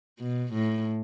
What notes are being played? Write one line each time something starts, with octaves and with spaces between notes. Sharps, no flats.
B2
A2